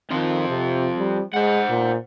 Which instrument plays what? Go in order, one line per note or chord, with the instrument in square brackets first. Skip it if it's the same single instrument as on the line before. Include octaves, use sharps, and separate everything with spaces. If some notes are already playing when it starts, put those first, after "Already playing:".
[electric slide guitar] F2 F3 F4 [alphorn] D#3
[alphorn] C3
G3
[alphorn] G#3 [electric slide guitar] C5 F#5
[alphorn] A#2